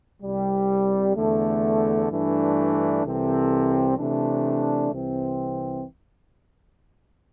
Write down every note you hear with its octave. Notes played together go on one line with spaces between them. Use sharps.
C2 C3 G3
E2 D3 A3
G2 E3 A3 D4
C2 C3 E3 C4 A4
C3 E3 A3 D4
C2 C3 E3 C4